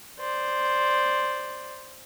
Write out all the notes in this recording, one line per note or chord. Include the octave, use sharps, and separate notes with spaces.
C5 D5